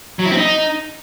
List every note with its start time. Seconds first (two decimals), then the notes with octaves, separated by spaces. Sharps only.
0.19 F#3
0.25 E4
0.31 C4
0.37 D#4